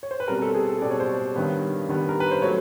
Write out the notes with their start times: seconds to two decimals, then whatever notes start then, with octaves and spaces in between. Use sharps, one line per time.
0.03 C#5
0.11 C5
0.20 B4
0.28 B2 G3 C4 A#4
0.42 A4
0.54 G#4
0.69 A4
0.82 B2 G3 C4 D5
0.91 C#5
1.00 C5
1.09 C#5
1.36 G2 D#3 G3 B3
1.89 G2 D#3 G3 B3
2.09 A#4
2.20 B4
2.31 C5
2.42 F#3 A3 C#5